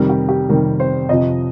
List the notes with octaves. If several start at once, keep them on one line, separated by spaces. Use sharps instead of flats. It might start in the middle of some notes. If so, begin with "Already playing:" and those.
Already playing: F2 C3 D#3 G3 A#4
G4
G4
F2 C3 D#3 G3 A#4
C5
F2 C3 F3 D#5